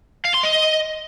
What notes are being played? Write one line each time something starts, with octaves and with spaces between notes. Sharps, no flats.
F5
C6
D#5